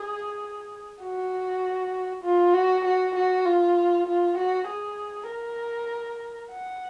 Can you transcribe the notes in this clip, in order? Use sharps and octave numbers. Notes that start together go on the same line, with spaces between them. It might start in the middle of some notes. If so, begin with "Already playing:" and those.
Already playing: G#4
F#4
F4
F#4
F#4
F#4
F4
F4
F#4
G#4
A#4
F#5